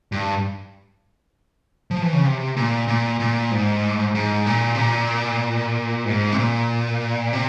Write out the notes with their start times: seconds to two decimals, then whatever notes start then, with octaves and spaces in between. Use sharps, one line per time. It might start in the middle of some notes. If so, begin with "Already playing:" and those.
0.12 G2
1.91 F3
2.02 E3
2.13 C#3
2.24 C3
2.57 A#2
2.88 A#2
3.20 A#2
3.51 G#2
4.15 G#2
4.46 A#2
4.75 C3
4.79 A#2
6.05 G#2
6.32 C3
6.38 A#2
7.33 C3